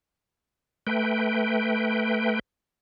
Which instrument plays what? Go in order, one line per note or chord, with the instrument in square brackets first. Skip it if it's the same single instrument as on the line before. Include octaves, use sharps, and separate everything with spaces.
[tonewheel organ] A3 B4 G5